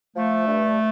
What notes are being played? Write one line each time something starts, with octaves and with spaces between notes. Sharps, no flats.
F3 A3
G2